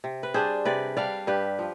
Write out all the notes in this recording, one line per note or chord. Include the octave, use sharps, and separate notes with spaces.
C3
B4
G3 D4 G#4 C5
C3 B4 D5
G3 D4 D5 F5
G2 G4 B4
F3